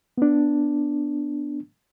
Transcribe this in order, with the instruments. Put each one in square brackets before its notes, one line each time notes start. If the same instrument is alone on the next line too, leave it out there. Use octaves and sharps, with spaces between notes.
[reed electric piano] B3 D4